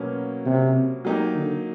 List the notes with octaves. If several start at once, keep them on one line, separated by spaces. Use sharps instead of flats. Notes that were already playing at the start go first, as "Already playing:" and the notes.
Already playing: B2 F#3 A#3 C#4
C3
F#3 A#3 D#4 G4
D3